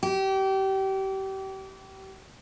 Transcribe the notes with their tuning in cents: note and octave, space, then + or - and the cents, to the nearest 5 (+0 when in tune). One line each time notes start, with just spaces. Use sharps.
G4 -30